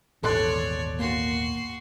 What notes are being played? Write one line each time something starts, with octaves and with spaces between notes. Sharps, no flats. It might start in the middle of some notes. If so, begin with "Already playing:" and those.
D#1 G#1 E2 A4 C#5 D5 C6 F#6
A#3 F#4 C6